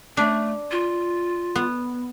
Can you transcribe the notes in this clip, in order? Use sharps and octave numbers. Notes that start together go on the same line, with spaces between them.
A3 D4
F4
B3